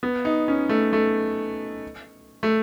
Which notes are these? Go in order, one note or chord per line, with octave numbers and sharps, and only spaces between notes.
B3
D#4
C#4
A3
A3
A3